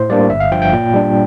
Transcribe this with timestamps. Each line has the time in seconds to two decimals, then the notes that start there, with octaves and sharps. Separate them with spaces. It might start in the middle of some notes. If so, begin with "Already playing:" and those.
Already playing: A2 C5
0.10 G3 A#3 D4 D5
0.30 G1 E5
0.40 F5
0.52 G2 F3 G5
0.62 G5
0.73 A#2
0.94 G3 D4